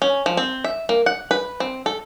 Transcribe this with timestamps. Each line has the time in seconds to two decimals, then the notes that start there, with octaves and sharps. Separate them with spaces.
0.02 C#4
0.26 F3
0.37 C4
0.64 E5
0.89 A#3
1.06 F#5
1.31 B4
1.60 C4
1.86 A4